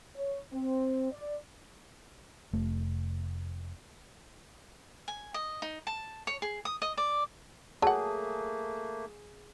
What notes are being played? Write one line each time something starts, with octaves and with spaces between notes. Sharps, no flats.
C#5
C4
D5
F1 A3
G#5
D#5
D#4
A5
C#5
G#4
D#6
D#5
D5
F#3 A3 A#3 G#4 F#5 A5